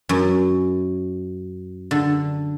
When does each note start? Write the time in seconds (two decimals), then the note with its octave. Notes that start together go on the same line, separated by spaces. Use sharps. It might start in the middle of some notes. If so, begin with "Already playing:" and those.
0.09 F#2
1.91 D3